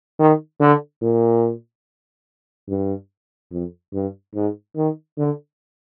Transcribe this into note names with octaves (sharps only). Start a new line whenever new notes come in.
D#3
D3
A#2
G2
F2
G2
G#2
D#3
D3